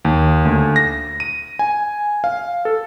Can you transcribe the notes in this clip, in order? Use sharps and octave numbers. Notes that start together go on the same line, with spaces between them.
D#2
D2
A#6
D#7
G#5
F5
A4